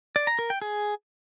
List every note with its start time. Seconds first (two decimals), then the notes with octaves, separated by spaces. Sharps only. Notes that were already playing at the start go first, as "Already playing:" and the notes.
0.16 D5
0.27 A#5
0.39 A#4
0.50 G5
0.62 G#4